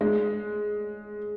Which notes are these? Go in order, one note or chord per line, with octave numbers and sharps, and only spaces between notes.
G#3